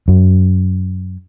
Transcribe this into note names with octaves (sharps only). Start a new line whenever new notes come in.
F#2